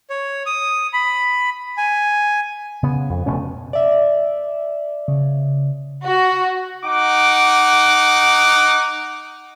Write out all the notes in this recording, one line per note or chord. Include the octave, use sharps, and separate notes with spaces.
C#5
D#6
B5
G#5
C#3 B3
F2
F1 B2 A3 C#4
D5 E5
C#3
F#4
D#4 F#5 D6